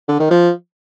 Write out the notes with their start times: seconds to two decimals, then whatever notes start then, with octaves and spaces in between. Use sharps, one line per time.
0.09 D3
0.20 D#3
0.31 F3